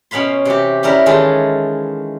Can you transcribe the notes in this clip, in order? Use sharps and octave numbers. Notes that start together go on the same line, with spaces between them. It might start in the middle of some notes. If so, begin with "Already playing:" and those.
B2 C#4 F5 B5 C6
C3 E3 F#4 G4
G3 C#4 E4 A#4 E5
D#3 E3 G#3 F4 A4 G#5